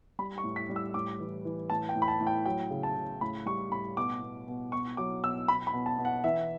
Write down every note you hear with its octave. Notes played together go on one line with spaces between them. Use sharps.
G3 B5
C#6
A2
B6
G3
E6
A2 D6
E3
E3
A2 A5
G5
A2
B5
A5
A2
G5
F#3 G5
C#3
A5
C#3
A2 B5
G3 C#6
A2 B5
B2 D6
B2
B2
B2 C#6
F#3 D6
B2 E6
B2 B5
B5
B2
A5
B2
F#5
E3 E5